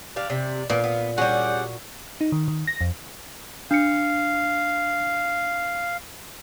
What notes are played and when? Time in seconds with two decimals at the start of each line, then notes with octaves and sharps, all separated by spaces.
0.16 D4 G4 D5 F5
0.30 C3
0.69 A#2 B3 F5
0.84 B3
1.18 G3 C#4 F#4 G#4 F#5
2.21 D#4
2.32 D#3
2.48 D#3
2.67 A#6
2.81 F2
3.71 D4 F5 C#7